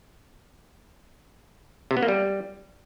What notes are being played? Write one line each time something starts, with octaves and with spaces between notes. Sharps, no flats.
C3
B3
A#3
G3